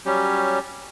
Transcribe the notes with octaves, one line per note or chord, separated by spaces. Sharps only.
F#3 G3 C#4 G4